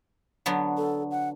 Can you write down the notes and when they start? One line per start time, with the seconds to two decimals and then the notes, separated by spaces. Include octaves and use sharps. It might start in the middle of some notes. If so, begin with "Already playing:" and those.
0.46 D3 F#3 B3
0.77 A4
1.11 F#5